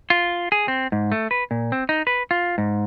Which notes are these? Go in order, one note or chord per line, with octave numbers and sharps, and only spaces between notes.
F4
G#4
C4
G#2
A3
B4
A#2
C4
D#4
B4
F4
G#2